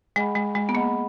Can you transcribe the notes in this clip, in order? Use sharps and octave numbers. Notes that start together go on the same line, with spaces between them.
G#3 G#4 D#5 F#5 B5
G#3
G#3
B3
A#3 G#4 D#5 F#5 B5